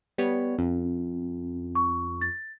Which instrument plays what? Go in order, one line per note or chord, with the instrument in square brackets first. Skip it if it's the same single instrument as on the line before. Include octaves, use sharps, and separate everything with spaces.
[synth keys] G3 B3 C#5
F2
[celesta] C#6
A6